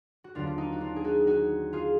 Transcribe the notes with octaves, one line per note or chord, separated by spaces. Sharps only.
F#4
D#2 D3 F#3 B3 D4 F4
F4
D#4
F#4
D4 F4
G#4
D#4 F#4
D#4 F#4
F4 G#4